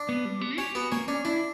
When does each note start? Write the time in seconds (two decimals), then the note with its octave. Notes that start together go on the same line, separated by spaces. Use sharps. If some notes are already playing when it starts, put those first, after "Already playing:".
Already playing: D4
0.09 B3
0.25 G3
0.41 B3
0.58 C#4 G4
0.75 B3 F#4
0.92 A#3 C#4
1.08 C#4 D4
1.25 D4 E4